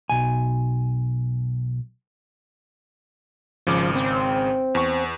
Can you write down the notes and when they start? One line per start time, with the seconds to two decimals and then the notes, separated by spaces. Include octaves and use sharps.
0.10 B1 G#5
3.67 G#1 C#3 F3 D6
3.95 C4
4.75 E2 C#6